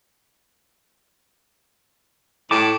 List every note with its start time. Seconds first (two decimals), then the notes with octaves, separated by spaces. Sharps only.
2.51 A2 G5 A5 D6